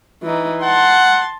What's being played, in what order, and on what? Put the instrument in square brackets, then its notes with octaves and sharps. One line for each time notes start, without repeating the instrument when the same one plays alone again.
[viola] E3 D#4
[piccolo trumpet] F#5 [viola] A5 C6